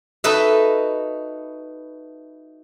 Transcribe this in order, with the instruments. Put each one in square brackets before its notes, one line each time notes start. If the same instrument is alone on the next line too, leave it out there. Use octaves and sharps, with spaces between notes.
[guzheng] D#4 F#4 A4 B4 D#5 E5